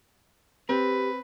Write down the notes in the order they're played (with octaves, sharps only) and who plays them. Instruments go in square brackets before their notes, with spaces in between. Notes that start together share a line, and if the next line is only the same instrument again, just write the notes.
[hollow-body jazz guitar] C4 [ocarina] G4 [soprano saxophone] B4